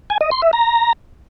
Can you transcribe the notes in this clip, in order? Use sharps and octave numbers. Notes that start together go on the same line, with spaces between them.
G#5
D#5
C6
E5
A#5